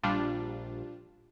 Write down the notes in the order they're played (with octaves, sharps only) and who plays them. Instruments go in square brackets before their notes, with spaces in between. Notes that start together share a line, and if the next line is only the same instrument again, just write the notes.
[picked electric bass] A#1 [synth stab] G3 D4 F4